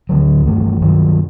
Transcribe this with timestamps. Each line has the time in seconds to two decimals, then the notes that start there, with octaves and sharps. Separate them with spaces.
0.09 D2 D3 F#3
0.46 G2 E3 A3
0.81 G2 D#3 F#3